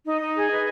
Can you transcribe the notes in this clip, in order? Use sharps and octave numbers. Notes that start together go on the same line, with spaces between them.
D#4 D#5
D#4
G#4
B4